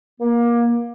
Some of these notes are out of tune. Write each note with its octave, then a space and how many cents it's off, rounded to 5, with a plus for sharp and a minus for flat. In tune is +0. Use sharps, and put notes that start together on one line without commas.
A#3 +25